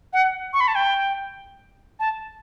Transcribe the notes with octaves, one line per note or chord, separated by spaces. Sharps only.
F#5
C#6
B5
A5
G5
A5